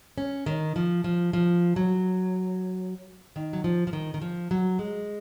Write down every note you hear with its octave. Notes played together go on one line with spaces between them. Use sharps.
C#4
D#3
F3
F3
F3
F#3
D#3
F#3
F3
F3
D#3
D#3
F3
F#3
G#3